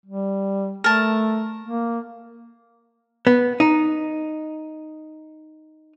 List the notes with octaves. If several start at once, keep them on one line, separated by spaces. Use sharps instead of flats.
G3
A3 A#4 A5
A#3
B3
D#4